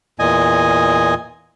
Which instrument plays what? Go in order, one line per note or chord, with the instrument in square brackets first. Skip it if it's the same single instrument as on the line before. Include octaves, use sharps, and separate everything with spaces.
[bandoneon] E2 A#2 D#5 G#5